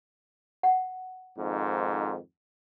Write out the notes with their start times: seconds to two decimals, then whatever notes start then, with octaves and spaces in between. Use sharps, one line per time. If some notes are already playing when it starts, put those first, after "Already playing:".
0.63 F#5
1.39 F2 G#2 D#3